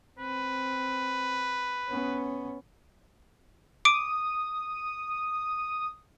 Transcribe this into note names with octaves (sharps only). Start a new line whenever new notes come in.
C4 B4
B3 C#4
D6 D#6 D7